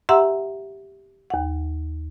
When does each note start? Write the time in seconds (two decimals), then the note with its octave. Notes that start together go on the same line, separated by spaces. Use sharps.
0.09 G4 E5 F#5 A#5 C6 E6
1.30 D#2 F#5